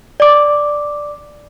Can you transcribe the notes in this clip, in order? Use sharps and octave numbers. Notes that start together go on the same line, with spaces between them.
D5 D6